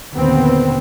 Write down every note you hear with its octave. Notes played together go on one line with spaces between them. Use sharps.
A#1 D#2 D3 B3 C4